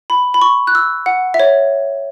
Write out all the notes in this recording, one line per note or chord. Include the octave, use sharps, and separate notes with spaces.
B5
B5
C#6
F#6
E6
F#5
E5
C#5